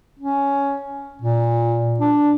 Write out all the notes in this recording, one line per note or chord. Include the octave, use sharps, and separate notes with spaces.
C#4
A#2
D4